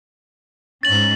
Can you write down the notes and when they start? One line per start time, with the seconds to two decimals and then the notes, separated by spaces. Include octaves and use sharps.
0.83 G#2 C#4 A6 F#7